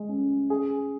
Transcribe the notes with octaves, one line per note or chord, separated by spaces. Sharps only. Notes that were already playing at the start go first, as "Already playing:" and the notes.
Already playing: G#3
C#4
G#4